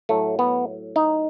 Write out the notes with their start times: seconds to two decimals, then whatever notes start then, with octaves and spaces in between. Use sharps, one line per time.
0.09 A2 F#3 A3
0.39 B3
0.96 D#4